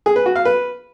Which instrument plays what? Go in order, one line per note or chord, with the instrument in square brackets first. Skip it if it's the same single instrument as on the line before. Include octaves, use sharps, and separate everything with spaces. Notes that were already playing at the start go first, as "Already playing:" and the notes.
[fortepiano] G#4
B4
F#4
F5
B4